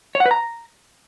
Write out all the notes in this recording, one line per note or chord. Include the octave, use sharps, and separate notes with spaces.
C#5
F#5
B4
A#5